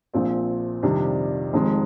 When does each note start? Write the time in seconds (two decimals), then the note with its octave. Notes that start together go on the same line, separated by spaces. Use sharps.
0.14 A#1 A#2 F3 C4
0.83 F2 C3 D#3 G3 D4
1.53 F1 F2 D#3 G#3